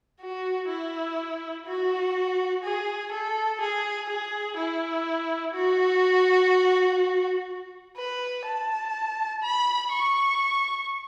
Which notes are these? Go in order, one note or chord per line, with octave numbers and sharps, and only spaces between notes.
F#4
E4
F#4
G#4
A4
G#4
G#4
E4
F#4
B4
A5
B5
C#6